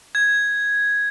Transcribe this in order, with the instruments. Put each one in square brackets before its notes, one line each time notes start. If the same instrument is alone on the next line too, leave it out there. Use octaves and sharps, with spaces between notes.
[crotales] G#6